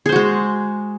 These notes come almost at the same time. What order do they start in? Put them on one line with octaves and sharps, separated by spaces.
G#4 C5 F#4 G#3